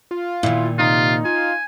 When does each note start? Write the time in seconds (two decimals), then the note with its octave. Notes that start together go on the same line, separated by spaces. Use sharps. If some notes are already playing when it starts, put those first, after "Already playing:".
0.11 F4
0.43 A#2 D#3 E4
0.79 C3 D#4 F4
1.25 F4 G#5